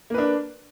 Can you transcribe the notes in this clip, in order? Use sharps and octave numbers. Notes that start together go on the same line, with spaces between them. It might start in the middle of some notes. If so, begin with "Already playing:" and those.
A#3 D4 B4